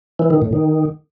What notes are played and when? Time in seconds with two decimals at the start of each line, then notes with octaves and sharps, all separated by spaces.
0.19 E3
0.30 D#3
0.42 A2
0.53 D#3